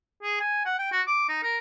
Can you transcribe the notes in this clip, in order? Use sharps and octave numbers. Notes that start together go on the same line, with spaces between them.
G#4
G#5
F#5
G5
F#4
D6
D#4
A#4